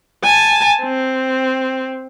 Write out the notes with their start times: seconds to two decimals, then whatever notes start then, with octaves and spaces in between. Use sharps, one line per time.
0.24 G#5 A5
0.83 C4